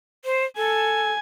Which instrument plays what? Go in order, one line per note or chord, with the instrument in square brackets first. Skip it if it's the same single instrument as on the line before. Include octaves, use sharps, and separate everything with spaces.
[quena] C5
[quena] A4 [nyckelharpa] G#5